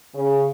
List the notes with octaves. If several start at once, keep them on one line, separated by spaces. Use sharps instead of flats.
C#3